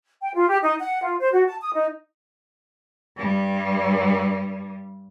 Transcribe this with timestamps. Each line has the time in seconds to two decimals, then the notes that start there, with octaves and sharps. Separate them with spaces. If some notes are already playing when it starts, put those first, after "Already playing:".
0.21 G5
0.35 F4
0.49 G4
0.62 D#4
0.80 F#5
1.02 F4
1.19 C5
1.32 F#4
1.46 A5
1.61 D#6
1.73 D#4
3.16 G2 G3